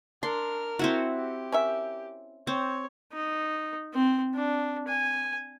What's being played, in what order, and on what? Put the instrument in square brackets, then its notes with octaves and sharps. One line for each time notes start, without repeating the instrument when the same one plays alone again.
[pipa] D4 [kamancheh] A#4 F6 [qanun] C6
[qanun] C4 E4 F#4
[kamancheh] G4
[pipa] C#4 A#4 E5
[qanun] C4 [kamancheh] C#5
[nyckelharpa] D#4
C4
D4
G#5